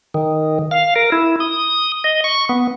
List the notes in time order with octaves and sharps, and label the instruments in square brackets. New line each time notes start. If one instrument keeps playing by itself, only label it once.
[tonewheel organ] D#3
F5
A#4
E4
D#6
D#5
C#6
B3